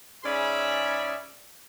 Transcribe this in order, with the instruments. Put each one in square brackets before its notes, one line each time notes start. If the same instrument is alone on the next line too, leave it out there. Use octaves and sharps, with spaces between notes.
[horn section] G#2 C#4 G#4 D5 E5 B5